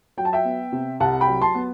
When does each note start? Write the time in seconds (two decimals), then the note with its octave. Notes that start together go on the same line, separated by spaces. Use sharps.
0.17 F#3 G5
0.25 A5
0.33 E5 G5
0.45 B3
0.72 C3
1.00 C2 F#5 A5
1.21 G5 B5
1.27 F#3
1.41 A5 C6
1.55 B3